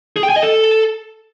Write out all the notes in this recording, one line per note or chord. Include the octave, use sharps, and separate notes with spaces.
G#4
G5
G#5
D#5
A4